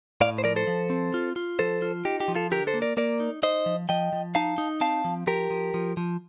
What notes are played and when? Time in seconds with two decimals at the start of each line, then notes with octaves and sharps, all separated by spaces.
0.21 A2 D5 F5
0.38 C5
0.44 F3 A#4 D5
0.56 A4 C5
0.67 F3
0.90 C4
1.14 F4
1.36 F4
1.59 F3 A4 C5
1.82 F4
2.05 D#4 G4
2.20 G4
2.28 F3
2.35 F4 A4
2.51 D3 G4 A#4
2.67 A4 C5
2.74 A#3
2.82 A#4 D5
2.97 A#3 A#4 D5
3.20 D#4
3.43 D#4 C5 D#5
3.66 F3
3.89 F3 D#5 G5
4.13 F3
4.35 D#4 F5 A5
4.58 D#4
4.81 C4 F5 A5
5.05 F3
5.27 F3 G4 A#4
5.51 F3
5.74 F3
5.97 F3